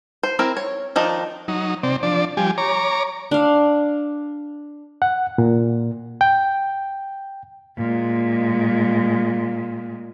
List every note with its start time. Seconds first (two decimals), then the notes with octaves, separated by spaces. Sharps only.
0.23 C5
0.39 C4 E4 A#4
0.57 C#5
0.96 D#3 F3 D4 D#4
1.48 F#3 D#4
1.83 C3 C4 D5
2.03 F3 D4 D5
2.37 F3 G3 G4 G#5
2.58 C#5 A#5 D6
3.31 D4 F5
5.02 F#5
5.38 A#2
6.21 G5
7.78 A#2 G#3